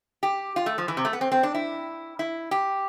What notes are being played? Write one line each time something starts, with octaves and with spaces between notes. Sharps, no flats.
G4
F4
A3
F3
E3
C3
A3
B3
C4
C4
D4
E4
E4
G4